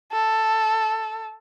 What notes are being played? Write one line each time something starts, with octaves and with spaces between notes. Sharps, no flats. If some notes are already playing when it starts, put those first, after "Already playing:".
A4